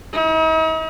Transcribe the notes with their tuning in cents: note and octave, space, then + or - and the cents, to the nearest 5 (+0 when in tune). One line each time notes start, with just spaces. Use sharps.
D#4 +45